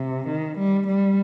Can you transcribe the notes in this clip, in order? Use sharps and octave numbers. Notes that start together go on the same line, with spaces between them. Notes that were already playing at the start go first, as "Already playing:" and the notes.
Already playing: C3
D#3
G3
G3